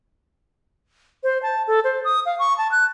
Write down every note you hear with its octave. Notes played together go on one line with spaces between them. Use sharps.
C5
A5
A4
C5
D#6
F5
C#6
A5
F#6